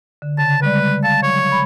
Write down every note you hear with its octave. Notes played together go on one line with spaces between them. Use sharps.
D3
C#3 A5
G3 G#3 B4 D5
F5 A5
F#3 C#5
B5